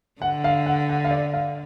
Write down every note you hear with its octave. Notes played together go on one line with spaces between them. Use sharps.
D3 F#5
F5
F#5
F#5
F5
D5
F5